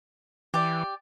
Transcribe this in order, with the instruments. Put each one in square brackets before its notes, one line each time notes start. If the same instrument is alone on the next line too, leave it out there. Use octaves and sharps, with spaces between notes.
[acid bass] E3 [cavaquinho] G4 D5